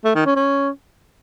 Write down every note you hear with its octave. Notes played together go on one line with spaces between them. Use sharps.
A3
D#3
C#4
C#4